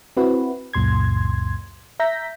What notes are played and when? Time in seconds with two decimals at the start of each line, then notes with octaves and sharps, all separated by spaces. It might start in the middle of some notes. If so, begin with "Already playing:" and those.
0.17 C4 E4 F#4 B4
0.73 C#2 F#2 A#2 C6 G#6
2.00 E5 A#5 G6 A#6 B6